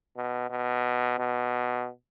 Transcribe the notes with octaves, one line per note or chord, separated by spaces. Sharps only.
B2
B2
B2